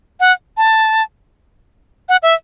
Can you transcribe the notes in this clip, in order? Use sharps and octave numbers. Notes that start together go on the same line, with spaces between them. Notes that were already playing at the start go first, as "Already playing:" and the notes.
F#5
A5
F#5
E5